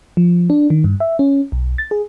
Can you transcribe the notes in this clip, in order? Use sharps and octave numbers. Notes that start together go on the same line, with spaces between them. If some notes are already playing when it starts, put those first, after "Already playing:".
F3
D4
D#3
G2
E5
C#4
B1
A6
G#4